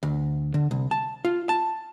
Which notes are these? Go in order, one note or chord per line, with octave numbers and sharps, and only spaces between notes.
D2
D3
C2
A5
F4
A5